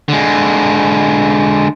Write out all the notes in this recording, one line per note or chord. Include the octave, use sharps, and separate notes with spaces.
D3 G#3